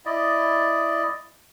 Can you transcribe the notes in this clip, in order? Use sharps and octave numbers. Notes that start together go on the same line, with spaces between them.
E4 D5 D#5